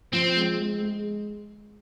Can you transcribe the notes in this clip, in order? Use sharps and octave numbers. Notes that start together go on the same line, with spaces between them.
F3 C4
G#3
G#3
G#3